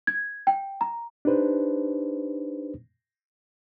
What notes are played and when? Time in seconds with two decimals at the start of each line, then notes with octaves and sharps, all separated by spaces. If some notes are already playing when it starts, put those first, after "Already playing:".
0.07 G#6
0.47 G5
0.81 A#5
1.25 D4 D#4 G4 B4 C5